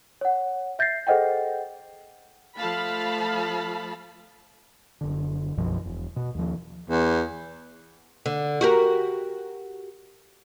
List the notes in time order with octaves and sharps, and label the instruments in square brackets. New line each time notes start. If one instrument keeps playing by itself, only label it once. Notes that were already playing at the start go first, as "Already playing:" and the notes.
[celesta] C#5 F#5
E5 G6 A6 A#6 C7
G#4 A4 C5 D#5 F#5 G5
[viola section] F3 A3 F5 A5 B5
[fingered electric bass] F#1 D3
B1 F#2 B2 F3
E1
B2
D#2 F3
[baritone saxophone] E2
[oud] D3
F#4 G4 A#4